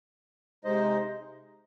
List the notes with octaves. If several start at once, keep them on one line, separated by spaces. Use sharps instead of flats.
C3 G#3 D#4 C5 D#5